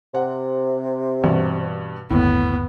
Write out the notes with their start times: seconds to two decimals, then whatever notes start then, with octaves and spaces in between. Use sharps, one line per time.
0.15 C3 F#5
1.24 G2 B2 E3 C4
2.11 G1 D#2 A2 B3